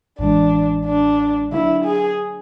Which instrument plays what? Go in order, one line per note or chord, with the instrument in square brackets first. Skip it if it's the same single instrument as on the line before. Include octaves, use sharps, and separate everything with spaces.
[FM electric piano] A1 A2 E3 G#3 [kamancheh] D4
[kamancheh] D4
[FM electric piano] D3 F#3 A#3 D4 [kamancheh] E4
[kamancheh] G#4